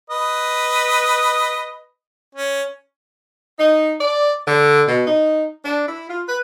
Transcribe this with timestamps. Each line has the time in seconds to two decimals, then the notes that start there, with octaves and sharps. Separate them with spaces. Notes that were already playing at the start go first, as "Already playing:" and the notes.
0.10 B4 D#5
2.35 C#4
3.59 D#4
4.00 D5
4.47 D3
4.88 B2
5.07 D#4
5.65 D4
5.88 E4
6.09 F4
6.28 B4